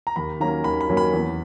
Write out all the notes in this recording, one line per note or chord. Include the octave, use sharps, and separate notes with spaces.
A#5
D#2 B5
D#3 F#3 A#3 C#4 A#5
D#2 B5
B5
D#3 F#3 A#3 C#4
B5
E2